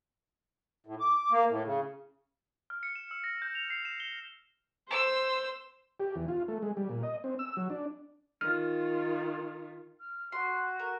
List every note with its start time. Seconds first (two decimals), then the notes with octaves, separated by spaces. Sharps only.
0.86 A2
1.00 D6
1.31 A#3
1.49 A2
1.65 C#3
2.70 F6
2.83 C#7
2.95 E7
3.11 E6
3.24 A#6
3.42 G6
3.55 F7
3.70 C7
3.85 E7
4.00 G7
4.91 C5 E6
6.00 G4
6.15 E2
6.28 F4
6.48 A3
6.62 G#3
6.77 G3
6.89 A#2
7.03 D#5
7.24 C4
7.39 E6
7.57 F#3
7.70 D4
8.41 D#3 F4 F6
10.00 F6
10.32 F#4 C6
10.79 A#4